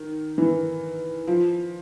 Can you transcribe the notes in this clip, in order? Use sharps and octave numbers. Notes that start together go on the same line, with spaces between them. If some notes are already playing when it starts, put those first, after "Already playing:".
Already playing: D#3
E3
F3